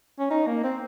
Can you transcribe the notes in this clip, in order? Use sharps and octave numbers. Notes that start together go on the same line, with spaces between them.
C#4
D#4
A#3
C4